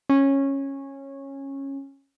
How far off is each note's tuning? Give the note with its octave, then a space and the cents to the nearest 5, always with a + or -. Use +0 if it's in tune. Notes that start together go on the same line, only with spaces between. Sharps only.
C#4 -15